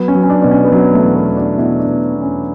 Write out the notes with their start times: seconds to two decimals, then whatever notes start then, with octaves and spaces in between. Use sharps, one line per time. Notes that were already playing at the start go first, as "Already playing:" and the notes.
Already playing: F#3 B3
0.08 C#4
0.15 F#3
0.23 C#4
0.30 D4
0.42 B2 D4
0.51 C#4
0.64 B3
0.72 F#3 C#4
0.94 A3
1.01 E2
1.15 B3
1.30 E2
1.37 D4
1.58 B2 E4
1.80 D4
1.87 B2
2.15 E2
2.22 C#4